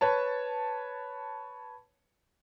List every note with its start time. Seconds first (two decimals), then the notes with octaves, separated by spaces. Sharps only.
0.01 B4 C#5 A5